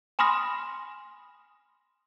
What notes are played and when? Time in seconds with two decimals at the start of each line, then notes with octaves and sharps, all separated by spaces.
0.19 G#5 B5 C6 D#6 F6 A#6